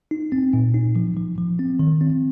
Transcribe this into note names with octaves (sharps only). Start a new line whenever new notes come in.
D#4
C4
A#2
D#4
F3
F3
F3
C4
D#3
C4